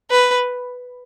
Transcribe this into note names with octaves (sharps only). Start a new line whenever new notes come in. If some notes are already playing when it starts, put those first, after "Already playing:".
B4